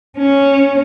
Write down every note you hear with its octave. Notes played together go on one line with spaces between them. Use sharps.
C#4